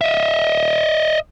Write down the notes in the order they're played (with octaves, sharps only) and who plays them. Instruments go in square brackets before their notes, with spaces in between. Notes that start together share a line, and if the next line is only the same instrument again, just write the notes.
[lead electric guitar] D#5 E5